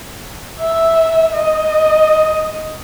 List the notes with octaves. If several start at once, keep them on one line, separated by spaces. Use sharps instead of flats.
E5
D#5